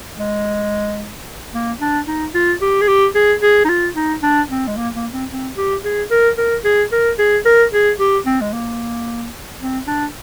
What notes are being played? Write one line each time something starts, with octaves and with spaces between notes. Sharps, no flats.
G#3
A#3
D4
D#4
F4
G4
G#4
G4
G#4
G#4
D#4
F4
D#4
D4
C4
G#3
A#3
A#3
C4
C4
G4
G#4
A#4
A#4
G#4
A#4
G#4
A#4
G#4
G4
C4
G#3
A#3
C4
D4